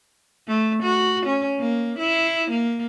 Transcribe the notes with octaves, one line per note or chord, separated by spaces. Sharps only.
A3
F#4
C#4
A#3
E4
A#3